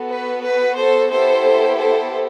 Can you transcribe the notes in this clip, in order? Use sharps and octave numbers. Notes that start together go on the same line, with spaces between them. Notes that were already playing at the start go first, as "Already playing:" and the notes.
Already playing: B3 F#4 A4
B4
B4
A4 C5
B3 E4 G4 A4 C5
A4 C5